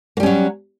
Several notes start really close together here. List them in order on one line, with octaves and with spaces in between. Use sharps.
A#3 G3 C#4 F#3